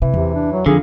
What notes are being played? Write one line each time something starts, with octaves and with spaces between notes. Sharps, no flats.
C3 E3
E2 C3
D4
F#3
F2 D3 D#3 F4 G#4